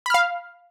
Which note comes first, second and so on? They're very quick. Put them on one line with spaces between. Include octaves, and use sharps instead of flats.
B5 F6 F5